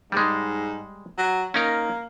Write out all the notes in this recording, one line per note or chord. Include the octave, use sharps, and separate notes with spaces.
G#2 G3 G#3
F#3
A#3 C#4 D#4 A#4